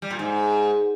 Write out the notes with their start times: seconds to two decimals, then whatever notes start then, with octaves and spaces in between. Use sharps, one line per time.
0.02 G3
0.11 A#2
0.19 G#2